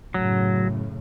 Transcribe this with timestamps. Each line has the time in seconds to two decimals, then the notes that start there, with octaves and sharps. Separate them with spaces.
0.14 F#2 A2 C#3 F#3